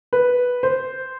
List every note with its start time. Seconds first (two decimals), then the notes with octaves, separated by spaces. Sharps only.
0.13 B4
0.63 C5